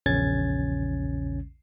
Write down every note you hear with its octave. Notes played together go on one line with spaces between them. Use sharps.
A#1 E2 C#3 C#4 G#6 A6